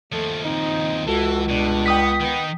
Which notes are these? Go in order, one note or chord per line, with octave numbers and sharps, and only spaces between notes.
D#2 F3 A3
C4 D#4
C#2 E3 F#4 A4
G2 B2 G#3 D4
B3 G5 D#6 B6
D#3 B3 D#4